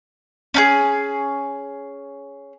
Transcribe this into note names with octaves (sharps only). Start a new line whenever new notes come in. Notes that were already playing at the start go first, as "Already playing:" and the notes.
C#4 D4 G#4